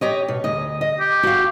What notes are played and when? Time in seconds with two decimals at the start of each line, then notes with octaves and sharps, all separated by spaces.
0.01 G4 C#5 D#5
0.28 B2
0.44 D2 D#5
0.81 D#5
1.00 G4
1.23 F#4 F5